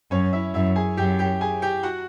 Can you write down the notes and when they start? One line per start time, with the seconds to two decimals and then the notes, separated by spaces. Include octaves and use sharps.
0.11 F#2 C#4 C#5
0.33 E4 E5
0.54 F#2 E4 E5
0.76 G#4 G#5
0.97 F#2 G4 G5
1.19 G4 G5
1.41 G#4 G#5
1.62 G4 G5
1.83 F#4 F#5